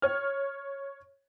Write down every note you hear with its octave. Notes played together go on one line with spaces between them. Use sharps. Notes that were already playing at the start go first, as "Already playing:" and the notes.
C#5 F6